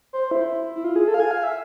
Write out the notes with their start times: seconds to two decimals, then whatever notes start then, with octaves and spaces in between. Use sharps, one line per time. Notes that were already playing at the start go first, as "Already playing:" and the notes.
0.13 C5
0.31 E4
0.76 E4
0.84 F4
0.96 G#4
1.08 A4
1.14 F5
1.20 G#5
1.31 F5
1.43 E5